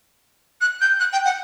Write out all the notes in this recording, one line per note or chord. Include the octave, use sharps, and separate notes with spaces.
F#6
G6
F#6
G5
F#5